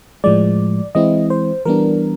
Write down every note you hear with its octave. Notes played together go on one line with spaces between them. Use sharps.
A2 F3 G#3 D5
E3 G#3 C4 E4 D#5
C5
E3 G3 B3 D4 A#4